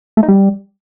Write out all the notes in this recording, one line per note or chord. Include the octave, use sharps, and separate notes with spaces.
A3
D#4
G3